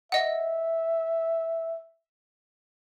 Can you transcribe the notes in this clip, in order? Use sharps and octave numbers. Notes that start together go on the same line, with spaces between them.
D#5 E5 F#5